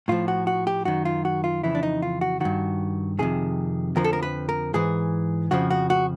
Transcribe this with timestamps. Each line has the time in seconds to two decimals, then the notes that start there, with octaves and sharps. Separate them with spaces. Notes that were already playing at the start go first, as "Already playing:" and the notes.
0.08 A2 F3 F4
0.28 F#4
0.47 F#4
0.67 G4
0.85 F#2 D#3 F#4
1.05 F4
1.25 F#4
1.44 F4
1.63 F2 C#3 E3 E4
1.75 D4
1.83 D#4
2.02 F4
2.21 F#4
2.40 G2 D#3 F#4
3.19 F2 C3 D#3 G#4
3.96 F2 D3 F3 A#4
4.04 A4
4.13 A#4
4.22 B4
4.49 A#4
4.74 G#2 E3 G#4
5.51 F2 C#3 F3 F#4
5.70 F#4
5.90 F#4